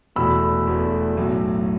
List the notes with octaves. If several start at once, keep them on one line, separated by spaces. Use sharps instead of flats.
E1 E2 B2 A3 B5 E6
E1 E2 B2 A3
B1 A2 F#3